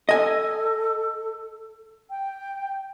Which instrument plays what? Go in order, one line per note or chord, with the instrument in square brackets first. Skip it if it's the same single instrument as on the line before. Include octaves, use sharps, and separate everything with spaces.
[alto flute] A4 [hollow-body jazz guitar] D#5 G#5
[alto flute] G5